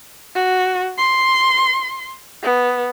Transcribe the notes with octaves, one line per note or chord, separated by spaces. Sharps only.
F#4
C6
B3